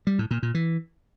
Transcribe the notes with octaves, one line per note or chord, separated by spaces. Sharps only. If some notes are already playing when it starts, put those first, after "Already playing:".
G3
A2
A#2
A#2
E3